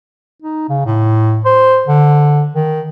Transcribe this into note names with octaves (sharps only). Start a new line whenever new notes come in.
D#4
C#3
A2
C5
D3
D#3